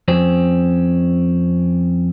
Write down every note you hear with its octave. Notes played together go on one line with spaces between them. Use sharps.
F2 C4 C#4